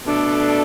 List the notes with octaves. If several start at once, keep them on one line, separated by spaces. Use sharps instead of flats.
B2 A3 D4 A4